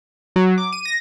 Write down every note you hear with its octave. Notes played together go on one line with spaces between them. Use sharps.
F#3
D6
D#7
A#6